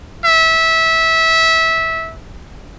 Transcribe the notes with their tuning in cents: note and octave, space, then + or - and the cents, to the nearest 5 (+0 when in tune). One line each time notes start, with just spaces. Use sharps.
E5 -20